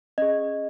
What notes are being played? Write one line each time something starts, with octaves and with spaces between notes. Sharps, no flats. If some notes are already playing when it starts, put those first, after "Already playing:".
C#4 G#4 D#5